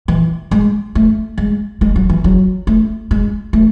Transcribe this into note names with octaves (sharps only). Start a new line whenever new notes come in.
E3
G#3
A3
G#3
G#3
F#3
E3
F#3
A3
G#3
A3